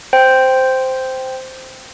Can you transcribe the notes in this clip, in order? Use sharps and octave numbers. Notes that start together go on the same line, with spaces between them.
C5 G5